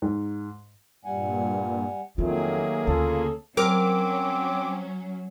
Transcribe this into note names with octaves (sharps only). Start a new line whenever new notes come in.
G#2
G2 A#2 G3 F#5 G#5
F2 D#3 F#3 A3 A#3 F4 G#4
D2 C#3 F4 A4
F#3 C4 C#4 A#4 D6